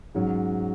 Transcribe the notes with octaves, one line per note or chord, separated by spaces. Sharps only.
G#2 F#3 C#4